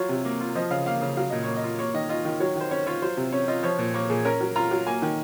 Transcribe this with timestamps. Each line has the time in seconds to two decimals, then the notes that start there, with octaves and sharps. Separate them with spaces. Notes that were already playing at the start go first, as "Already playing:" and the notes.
Already playing: F#3 F4 C#5
0.09 C3
0.25 A#3
0.40 F4
0.55 F3 D#5
0.71 C#3 F5
0.86 A#3 F5
1.02 C#3
1.17 F#3 F5
1.30 A#2 D#5
1.43 A#3 C#5
1.56 D#5
1.63 F4
1.79 A#3 C#5
1.94 D#3 D#5
2.09 F4 D#5
2.25 D#3
2.40 F#3 C#5
2.55 D#3 C5
2.71 C#4 C#5
2.86 F4 C#5
3.02 F#3 C5
3.17 C3
3.32 C#4 C#5
3.48 F4 D#5
3.63 F3 C#5
3.79 A#2
3.94 A#3 C#5
4.09 A#2 G#4
4.25 C#4 A#4
4.41 F#3
4.56 F4 A#5
4.71 F#3
4.86 A#3 G#5
5.02 D#3